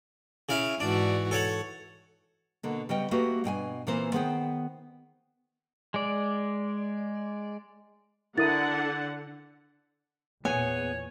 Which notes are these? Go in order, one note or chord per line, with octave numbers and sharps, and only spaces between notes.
C#3 E4 F5
G#2 E3 D4 F#4
A4 C#5 F#5
B2 D3 A#3
C#3 G3 B3 D#5 G5
A3 A#3 F#4 G4 B4
G2 B2 G5 G#5
A#2 E3 A#3 C4 C5
D#3 B3 G#4 C5 G5
G#3 D5
D3 E4 A#4 F#5 D#6 A6
E2 A#2 B3 G#4 C#5 G#5